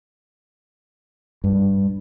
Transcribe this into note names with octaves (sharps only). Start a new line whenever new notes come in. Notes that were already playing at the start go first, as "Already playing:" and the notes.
G2